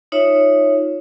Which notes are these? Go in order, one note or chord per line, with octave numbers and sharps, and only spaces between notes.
D#4 F4 C#5 E5